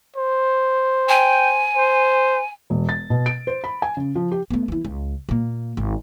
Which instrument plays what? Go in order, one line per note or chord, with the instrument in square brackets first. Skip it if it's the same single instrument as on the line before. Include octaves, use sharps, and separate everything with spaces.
[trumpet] C5
[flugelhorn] G5 [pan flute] G#5
[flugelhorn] C5
[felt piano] E1
A6
B2
D7
C5
B5
G#5
C#3
F3
G4
[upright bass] A3 B3
E3 E4
C#2
A#2 A#3
G#1